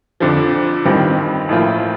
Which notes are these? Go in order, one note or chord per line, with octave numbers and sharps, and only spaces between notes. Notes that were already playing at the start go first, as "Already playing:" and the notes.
F2 D3 F3
A1 G2 D#3 G3 C4
A1 A2 F3 A#3 F4